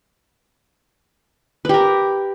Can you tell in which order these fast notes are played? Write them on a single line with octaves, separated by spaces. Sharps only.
B4 G4 A#4